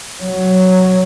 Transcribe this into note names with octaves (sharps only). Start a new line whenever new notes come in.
F#3